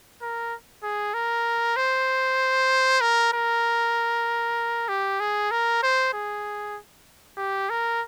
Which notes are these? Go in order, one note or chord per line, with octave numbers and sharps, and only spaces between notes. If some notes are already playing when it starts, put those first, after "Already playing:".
A#4
G#4
A#4
C5
A#4
A#4
G4
G#4
A#4
C5
G#4
G4
A#4